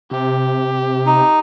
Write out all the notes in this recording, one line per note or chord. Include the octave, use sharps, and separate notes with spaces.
C3 G4
D#4